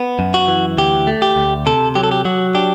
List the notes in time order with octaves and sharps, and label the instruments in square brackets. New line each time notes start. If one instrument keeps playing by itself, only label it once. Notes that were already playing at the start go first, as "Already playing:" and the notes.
Already playing: [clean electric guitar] B3
F#2
F#4
E3
D2 G4
A3
G4
D2
C3 A4
F#3 G4
A4
G4
F#3 F#4
D4 G4